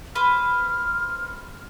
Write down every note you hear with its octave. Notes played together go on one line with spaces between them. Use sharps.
B4 C5 F6